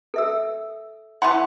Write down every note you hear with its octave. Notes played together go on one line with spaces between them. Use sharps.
A4 E5 E6
E3 A3 F#5 B5 C6